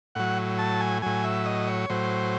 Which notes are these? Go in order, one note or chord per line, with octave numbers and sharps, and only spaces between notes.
A2 F#3 F#5
A5
G#5
A2 F#3 G#5
E5
D#5
C#5
A2 F#3 C5